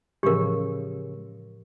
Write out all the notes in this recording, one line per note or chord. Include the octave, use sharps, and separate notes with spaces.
A2 C#3 E3 F3 G#3 G4 A#4